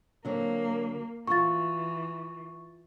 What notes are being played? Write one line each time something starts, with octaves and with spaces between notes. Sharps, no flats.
D3 F#3 A#3 C4
E3 F4 F#4 C#6 A6